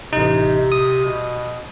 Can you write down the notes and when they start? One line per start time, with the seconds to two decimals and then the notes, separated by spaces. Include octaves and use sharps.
0.13 A1 C3 D#4
0.72 D#6
1.05 B2